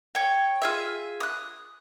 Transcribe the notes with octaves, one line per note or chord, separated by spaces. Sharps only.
C#5 G5
F4 G#4 E5
D#6 F#6